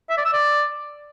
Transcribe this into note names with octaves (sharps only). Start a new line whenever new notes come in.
E5
D5
E6
D5